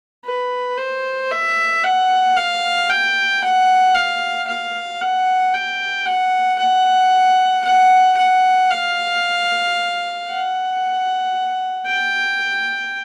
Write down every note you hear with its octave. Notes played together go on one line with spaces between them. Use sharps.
B4
C5
E5
F#5
F5
G5
F#5
F5
F5
F#5
G5
F#5
F#5
F#5
F#5
F5
F#5
G5